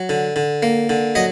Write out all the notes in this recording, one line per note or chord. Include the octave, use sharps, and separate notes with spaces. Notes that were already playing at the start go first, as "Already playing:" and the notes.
Already playing: F#3
D3
D3
A#3
D3
F#3 D#5